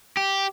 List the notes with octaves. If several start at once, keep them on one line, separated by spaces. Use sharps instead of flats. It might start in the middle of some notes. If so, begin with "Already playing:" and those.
G4